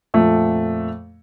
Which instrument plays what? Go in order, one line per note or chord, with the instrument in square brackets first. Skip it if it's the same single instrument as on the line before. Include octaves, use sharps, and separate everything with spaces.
[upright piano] F2 A#2 A3